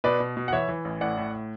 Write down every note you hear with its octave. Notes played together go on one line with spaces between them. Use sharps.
B2 B4 D5
B2
B2
F#5
E3 C#5 E5
E3
A1
A2 D5 F#5
A2